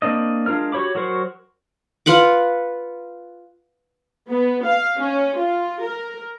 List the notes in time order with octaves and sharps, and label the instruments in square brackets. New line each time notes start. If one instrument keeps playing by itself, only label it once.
[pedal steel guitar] A#3 C4 D4 D#5
G#3 D4 F4 A#4 F6
F#4 G4 C#5 B5 D6
F#3 F#4 A#4 C5 C#6
[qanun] F4 B4 F#5 D6
[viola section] B3
F5
C#4
F4
A#4